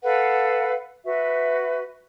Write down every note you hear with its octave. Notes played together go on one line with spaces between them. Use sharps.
A4 B4 F5 F#5
F#4 B4 E5